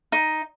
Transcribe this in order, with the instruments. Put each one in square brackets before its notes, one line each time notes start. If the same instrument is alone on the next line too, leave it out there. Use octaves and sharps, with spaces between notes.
[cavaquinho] D#4